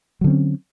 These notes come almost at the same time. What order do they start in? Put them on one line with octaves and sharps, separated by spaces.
F#3 D3 C4 C#4